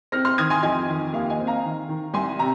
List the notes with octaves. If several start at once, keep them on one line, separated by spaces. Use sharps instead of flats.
C4 F6 A#6
C6 F6
D#3 D#6 G#6
G#5 C6
F2 D#5 G#5
D#3
D#2 F5
D#5 G#5
C4
F5 A#5
D#3
D#3
C2 G#5 C6
C3 A#5